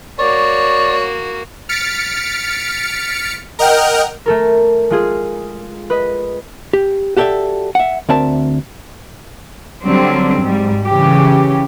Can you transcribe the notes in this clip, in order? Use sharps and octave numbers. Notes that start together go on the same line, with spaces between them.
A#3 F#4 C#5 D5
F6 A6 B6 C#7 D7
A#4 D#5 F#5 G5 F6
A3 A4 A#4
G#3 F4 G#4
B4 D#5
G4
F#4 G4 A4 C#5 D5 E5
E5 F#5
D2 C4 A#4 D5 E5 A5
D3 F#3 G3 C4
G#2 G3
C#3 E3 G4